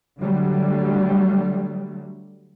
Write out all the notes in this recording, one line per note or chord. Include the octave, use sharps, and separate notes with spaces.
D3 F#3 G3 A3